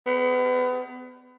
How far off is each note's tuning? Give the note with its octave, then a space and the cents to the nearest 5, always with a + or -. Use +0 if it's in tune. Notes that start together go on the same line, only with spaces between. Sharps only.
B3 +30